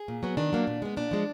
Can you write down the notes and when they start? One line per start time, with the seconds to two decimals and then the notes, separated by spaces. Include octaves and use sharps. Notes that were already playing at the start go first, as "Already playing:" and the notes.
Already playing: G#4
0.08 A#2
0.23 F#3 B3
0.37 D#3 D4
0.53 F#3 A#3
0.67 A#2
0.82 G#3 B3
0.97 A#2 D4
1.11 F3 G#3